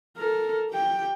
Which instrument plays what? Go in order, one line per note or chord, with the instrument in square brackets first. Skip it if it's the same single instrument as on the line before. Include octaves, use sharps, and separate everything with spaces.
[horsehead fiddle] A4 A#4
G4 G5